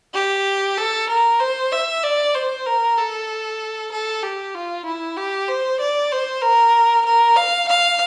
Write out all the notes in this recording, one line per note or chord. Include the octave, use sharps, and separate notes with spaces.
G4
A4
A#4
C5
E5
D5
C5
A#4
A4
A4
G4
F4
E4
G4
C5
D5
C5
A#4
A#4
F5
F5